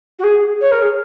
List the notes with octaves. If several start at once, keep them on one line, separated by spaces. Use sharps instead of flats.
F#4
G#4
C#5
A#4
G#4